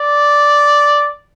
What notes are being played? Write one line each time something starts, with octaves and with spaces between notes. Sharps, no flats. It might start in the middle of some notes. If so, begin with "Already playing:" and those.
Already playing: D5